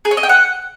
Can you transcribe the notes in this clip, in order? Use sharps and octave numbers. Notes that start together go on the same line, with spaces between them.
G#4
C#5
D#5
G5
F#5